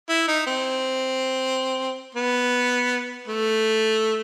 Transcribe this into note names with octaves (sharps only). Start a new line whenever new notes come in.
E4
D#4
C4
B3
A3